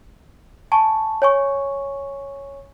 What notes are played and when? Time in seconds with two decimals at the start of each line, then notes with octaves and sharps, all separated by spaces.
0.72 G#5 A5 C#6
1.22 C#5 G#5 C#6